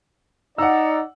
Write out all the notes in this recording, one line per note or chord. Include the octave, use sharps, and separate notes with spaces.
D#4 D5 F#5 E6